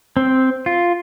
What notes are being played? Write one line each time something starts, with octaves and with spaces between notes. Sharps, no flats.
C4
F4